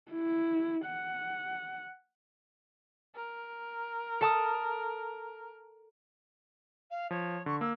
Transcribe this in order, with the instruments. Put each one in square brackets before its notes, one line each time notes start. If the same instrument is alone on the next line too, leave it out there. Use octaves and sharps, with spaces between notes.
[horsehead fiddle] E4
F#5
[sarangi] A#4
[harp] A4 A5 D#6
[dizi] F5
[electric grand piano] F3 [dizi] C#5
[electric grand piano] D3 [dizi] C#6
[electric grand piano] A#3 [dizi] E6